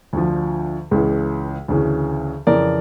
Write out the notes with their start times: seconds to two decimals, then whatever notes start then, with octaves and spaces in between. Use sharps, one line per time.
0.13 D2 D3 F3
0.91 C#2 C#3 E3
1.68 D2 C#3 E3
2.47 F2 C#3 E3 A#4 D5